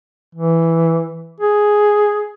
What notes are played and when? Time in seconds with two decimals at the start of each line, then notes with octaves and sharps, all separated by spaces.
0.35 E3
1.40 G#4